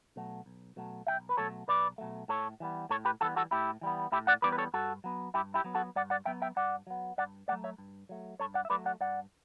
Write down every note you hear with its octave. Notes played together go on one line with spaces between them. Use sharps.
B2 F#3 A3
B1
B2 F#3 A3
B1 E5 G5
B4
B2 F#3 A3 A4 C#5
B1 B4 D5
B2 F#3 A3
A2 A4 C#5
E3 G3 B3
A2 A4 C#5
G4 B4
E3 G3 B3 F#4 A4
F#4 A4
A2 E4 G4
E3 G3 B3
A2 E4 G4
D5 F#5
E3 G3 B3 B4 D5
B4
A4 C#5
G2 F#4 A4
F#3 B3
G2 E4 G4
E4 G4
F#3 B3
F#4 A4
G2 D5 F#5
D5 F#5
F#3 B3 E5 G5
E5 G5
G2 D5 F#5
F#3 B3
G2 D5 F#5
F#3 A3 D5 F#5
C#5 E5
G2
F#3 A3
G2 A4 C#5
D5 F#5
E5
F#3 A3 B4 D5
D5 F#5
G2 D5 F#5